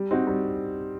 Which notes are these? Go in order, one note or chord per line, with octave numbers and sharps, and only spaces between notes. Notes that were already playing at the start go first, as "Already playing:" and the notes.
Already playing: G3
C4 D#4 F#4
G3